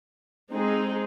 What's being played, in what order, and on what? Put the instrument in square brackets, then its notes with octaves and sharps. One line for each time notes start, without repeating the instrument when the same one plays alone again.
[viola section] G#3 C4 D#4 G#4